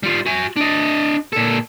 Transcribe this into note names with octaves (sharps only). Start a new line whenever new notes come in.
G3 F4
F#4 G#5
D4 D#5
A#2 A4